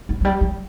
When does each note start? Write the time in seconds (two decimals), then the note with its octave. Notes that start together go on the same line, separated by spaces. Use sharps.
0.09 F#3
0.20 F#3
0.25 G3
0.41 F#3